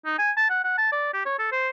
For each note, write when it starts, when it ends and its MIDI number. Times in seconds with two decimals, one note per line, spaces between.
0.05 0.17 63
0.19 0.31 80
0.37 0.47 81
0.50 0.60 78
0.64 0.76 78
0.78 0.87 81
0.92 1.10 74
1.14 1.25 67
1.26 1.37 73
1.39 1.49 69
1.52 1.69 72